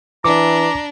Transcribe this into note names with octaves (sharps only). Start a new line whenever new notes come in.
E3 D4 A#5 D6